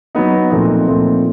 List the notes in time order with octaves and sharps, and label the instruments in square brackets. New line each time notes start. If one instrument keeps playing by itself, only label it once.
[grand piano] F#3 B3 D#4
A#2 F3 A3 C4 D#4
A#2 F3 A3 C4 D#4